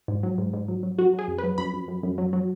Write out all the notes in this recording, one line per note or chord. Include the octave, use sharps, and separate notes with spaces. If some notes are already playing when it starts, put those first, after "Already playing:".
G#2
F#3
G#2
G#2
F#3
F#3
F#3 F#4
F#3
G#4
F#2
B4
F#3
F#2 B5
F#2
F#2
F#2
F#3
F#3